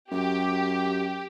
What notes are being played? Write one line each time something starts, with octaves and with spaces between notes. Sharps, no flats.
F#2 G4